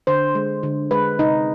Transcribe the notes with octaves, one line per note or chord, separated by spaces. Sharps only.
D3 C5
G#3
D3
G#3 B4
C3 D#4